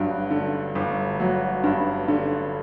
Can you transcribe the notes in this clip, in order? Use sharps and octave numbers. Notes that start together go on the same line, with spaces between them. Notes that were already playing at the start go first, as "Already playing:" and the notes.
Already playing: G1 G2 F#3
D3
G1
F#3
G2
D3